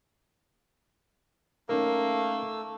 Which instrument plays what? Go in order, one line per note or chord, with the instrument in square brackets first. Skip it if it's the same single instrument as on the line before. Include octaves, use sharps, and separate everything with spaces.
[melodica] A3 E6 [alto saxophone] A#3 [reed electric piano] C#4 D#4 A#4